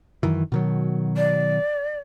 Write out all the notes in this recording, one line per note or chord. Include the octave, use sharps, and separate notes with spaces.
F#2 D#3 E3
B2 D#3 F#3
D5